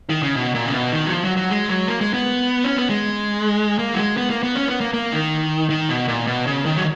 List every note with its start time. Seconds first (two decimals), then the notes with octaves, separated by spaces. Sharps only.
0.10 D#3
0.23 C#3
0.36 B2
0.55 A#2
0.65 C#3
0.73 B2
0.92 D#3
1.06 F#3
1.12 F3
1.24 F#3
1.37 F#3
1.50 G#3
1.69 F#3
1.88 A#3
2.01 G#3
2.14 B3
2.64 C#4
2.77 B3
2.90 G#3
3.79 A#3
3.94 F#3
3.98 G#3
4.17 B3
4.30 A#3
4.43 B3
4.55 C#4
4.68 B3
4.81 A#3
4.93 A#3
5.12 D#3
5.70 D#3
5.89 B2
6.08 A#2
6.27 B2
6.47 C#3
6.65 D#3
6.77 F#3